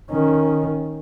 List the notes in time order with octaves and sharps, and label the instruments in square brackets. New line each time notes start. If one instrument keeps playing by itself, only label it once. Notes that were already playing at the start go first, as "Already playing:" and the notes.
[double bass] D#3 C#4